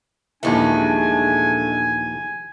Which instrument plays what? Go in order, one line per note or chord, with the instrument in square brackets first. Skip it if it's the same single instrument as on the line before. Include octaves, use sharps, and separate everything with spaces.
[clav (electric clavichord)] A#1 D#2 E3 [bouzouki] G#3 A3 [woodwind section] D4 [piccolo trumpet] G#5